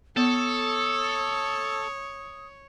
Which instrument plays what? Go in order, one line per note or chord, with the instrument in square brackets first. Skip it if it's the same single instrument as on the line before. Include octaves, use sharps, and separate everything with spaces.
[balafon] B3 [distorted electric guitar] A4 [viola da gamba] C#5 [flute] D#6